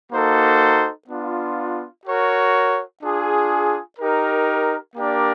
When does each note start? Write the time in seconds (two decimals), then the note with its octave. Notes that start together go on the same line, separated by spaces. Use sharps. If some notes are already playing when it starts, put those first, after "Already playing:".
0.12 A#3 D#4 F#4 A4 C5
1.08 B3 D4 F4
2.05 F#4 A#4 C#5
3.02 D4 F4 G#4
3.99 D#4 G4 A#4
4.96 A#3 D4 G4 A#4 D5